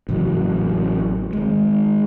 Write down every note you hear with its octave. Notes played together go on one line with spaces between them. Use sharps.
A1 C#3 F#3
D#3 G#3